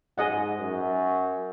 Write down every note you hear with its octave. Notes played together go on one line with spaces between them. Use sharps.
G#2 G#4 D#5 F#5
F#2